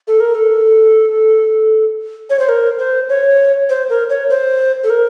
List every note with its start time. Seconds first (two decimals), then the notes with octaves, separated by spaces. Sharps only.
0.07 A4
0.20 A#4
0.35 A4
2.30 C#5
2.39 C5
2.49 A#4
2.79 C5
3.09 C#5
3.69 C5
3.89 A#4
4.10 C#5
4.29 C5
4.84 A4
4.90 A#4